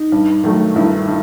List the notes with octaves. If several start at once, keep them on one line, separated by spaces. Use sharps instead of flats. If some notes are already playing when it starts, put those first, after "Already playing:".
Already playing: D#4
G2
D#3 F#3 A3
G2 E4
D#3